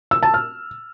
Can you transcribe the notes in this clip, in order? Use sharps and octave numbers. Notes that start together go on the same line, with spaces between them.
E6
A5
F6